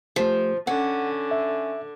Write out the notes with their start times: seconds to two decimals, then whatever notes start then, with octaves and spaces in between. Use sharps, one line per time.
0.16 F3 A3 G4
0.67 D3 C#4 F#5
1.31 E5